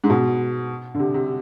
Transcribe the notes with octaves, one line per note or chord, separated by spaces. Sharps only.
G#2
B2
D3
C3
C3